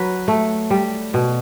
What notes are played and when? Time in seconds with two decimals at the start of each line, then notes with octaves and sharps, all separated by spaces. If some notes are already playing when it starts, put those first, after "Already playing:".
Already playing: F#3 B4
0.28 A3
0.70 G3
1.14 B2